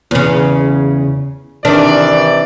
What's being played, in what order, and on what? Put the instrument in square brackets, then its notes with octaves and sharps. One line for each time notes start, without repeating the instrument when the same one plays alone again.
[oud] E2 C#3
[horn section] C3 E3 D5 [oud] D#3 D4